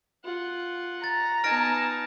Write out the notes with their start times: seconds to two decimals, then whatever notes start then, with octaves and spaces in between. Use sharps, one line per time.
0.25 F4 F#5
1.04 A#5 A6
1.44 B3 D#4 G#5 A5 F6 A#6 D7